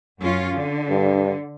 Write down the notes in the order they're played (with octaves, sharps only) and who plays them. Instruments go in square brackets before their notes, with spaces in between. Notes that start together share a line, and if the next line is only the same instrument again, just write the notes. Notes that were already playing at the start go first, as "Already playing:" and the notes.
[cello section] F#2 C#4 F4
D3
[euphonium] G2